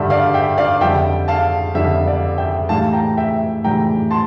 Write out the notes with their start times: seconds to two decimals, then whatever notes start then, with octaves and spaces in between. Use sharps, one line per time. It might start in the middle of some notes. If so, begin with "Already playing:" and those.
Already playing: G2 D3 G3 E5
0.10 D5 F5
0.34 E5 G5
0.58 D5 F5
0.81 F2 D3 G3 E5 G5
1.28 F5 A5
1.75 F2 D3 G3 E5
2.07 D5 F5
2.38 E5 G5
2.69 A2 E3 G3 F5 A5
2.93 G5 A#5
3.17 E5 G5
3.64 A2 E3 G3 G5 A#5
4.11 A5 C6